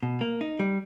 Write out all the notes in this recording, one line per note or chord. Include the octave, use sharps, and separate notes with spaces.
B2
A#3
D#4
G3